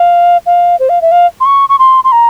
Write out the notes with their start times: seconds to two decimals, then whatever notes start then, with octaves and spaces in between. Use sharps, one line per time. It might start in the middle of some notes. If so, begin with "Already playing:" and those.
Already playing: F5
0.46 F5
0.79 C5
0.89 F5
1.02 E5
1.12 F5
1.40 C6
1.45 C#6
1.69 C#6
1.79 C6
2.04 C6
2.12 A#5